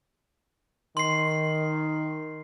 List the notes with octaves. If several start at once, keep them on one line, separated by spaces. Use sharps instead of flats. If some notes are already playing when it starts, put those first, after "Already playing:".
D#3 C6 C7